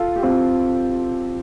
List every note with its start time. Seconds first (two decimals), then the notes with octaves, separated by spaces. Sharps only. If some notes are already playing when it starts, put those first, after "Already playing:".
Already playing: F4 A4
0.16 G4
0.23 C4 F4